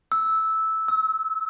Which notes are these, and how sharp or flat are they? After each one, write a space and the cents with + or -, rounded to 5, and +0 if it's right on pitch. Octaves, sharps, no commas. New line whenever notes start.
E6 -10
E6 -35